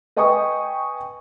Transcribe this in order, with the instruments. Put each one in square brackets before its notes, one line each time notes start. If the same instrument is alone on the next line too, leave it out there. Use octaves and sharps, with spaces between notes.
[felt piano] B4 D#5 G5 G#5 C#6 D#6